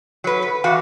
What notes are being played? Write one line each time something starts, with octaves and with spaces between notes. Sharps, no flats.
F#3 B4
B4
E2 F#4 F5